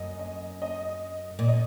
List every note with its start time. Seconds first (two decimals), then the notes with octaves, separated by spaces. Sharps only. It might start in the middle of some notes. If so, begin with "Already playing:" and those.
Already playing: F#2 D#5
0.19 D#5
0.62 D#5
1.39 A#2
1.48 D#5